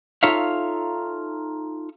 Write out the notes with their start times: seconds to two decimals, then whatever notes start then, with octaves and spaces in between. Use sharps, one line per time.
0.23 D#4 F4 A4 C#5 E5 F5